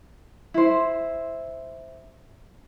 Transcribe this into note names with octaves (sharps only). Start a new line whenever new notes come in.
E4 C5